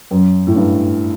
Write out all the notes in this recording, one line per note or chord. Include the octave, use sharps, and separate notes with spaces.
F#2
A2
G2